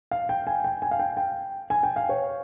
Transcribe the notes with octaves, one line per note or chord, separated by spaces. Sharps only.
F5
G5
G#5
G5
G#5
F5
G5
G5
G#5
G5
F5
C#5